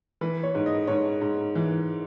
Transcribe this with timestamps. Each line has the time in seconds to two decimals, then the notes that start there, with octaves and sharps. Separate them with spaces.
0.21 E3 B4
0.43 C#5
0.55 G#2
0.66 D#5
0.87 G#2 C#5
1.21 G#2
1.55 E3